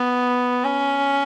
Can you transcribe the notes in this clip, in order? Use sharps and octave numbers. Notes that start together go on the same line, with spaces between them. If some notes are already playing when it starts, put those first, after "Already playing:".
Already playing: B3
C#4